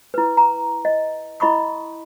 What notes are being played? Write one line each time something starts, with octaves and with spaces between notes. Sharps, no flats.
E4 B4
A#5
D#5
E4 D#5 B5 C#6 D#6